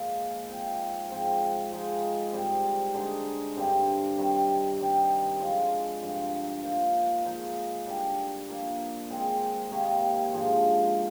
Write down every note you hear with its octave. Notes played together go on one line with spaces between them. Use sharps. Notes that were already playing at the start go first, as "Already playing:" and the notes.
Already playing: A#2 F3 G#3 A#3
F3 C4 D#4
G#2 F3 C4
F3 G#3 D#4
G#2 G3 C4
D3 G#3 D#4
G2 D3 G3 C4
C3 D#3 G3
D#3 G3 C4 D#4
F3 G#3 D4 F4
G2 D3 F3
F3 A#3 D#4
F3 G#3 D#4
D3 G3 D4
F3 A#3 D4
D#3 G#3 C4
C3 D#3 A#3
G#2 F3 G#3 D4